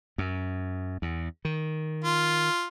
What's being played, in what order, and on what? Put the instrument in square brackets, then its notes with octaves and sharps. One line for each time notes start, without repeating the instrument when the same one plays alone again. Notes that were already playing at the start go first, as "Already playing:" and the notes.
[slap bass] F#2
E2
D#3
[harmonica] F4